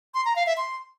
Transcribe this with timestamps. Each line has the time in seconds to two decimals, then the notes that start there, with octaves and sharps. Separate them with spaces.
0.14 C6
0.25 A#5
0.36 F5
0.47 E5
0.57 C6